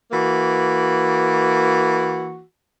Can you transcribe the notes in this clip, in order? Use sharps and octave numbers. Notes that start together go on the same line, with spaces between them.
E3 A#3 F#4